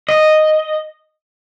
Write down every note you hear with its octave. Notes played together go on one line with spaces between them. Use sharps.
D#5